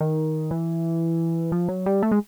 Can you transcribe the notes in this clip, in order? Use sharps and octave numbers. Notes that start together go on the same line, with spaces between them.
D#3
E3
F3
F#3
G3
A3
G#3